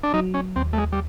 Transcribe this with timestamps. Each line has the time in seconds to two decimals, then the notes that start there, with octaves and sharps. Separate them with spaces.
0.03 D4
0.14 F#3 D#4
0.34 C#4
0.56 D#2 C4
0.73 A3
0.78 G#3
0.92 G3